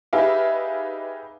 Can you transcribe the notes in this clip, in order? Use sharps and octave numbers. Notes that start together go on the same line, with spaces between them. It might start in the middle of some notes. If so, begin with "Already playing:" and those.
D#4 G4 G#4 B4 E5 F5